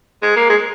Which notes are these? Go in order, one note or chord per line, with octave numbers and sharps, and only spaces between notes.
G#3
A#3
G#3